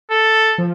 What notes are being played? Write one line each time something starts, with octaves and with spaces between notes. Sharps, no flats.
A4
F3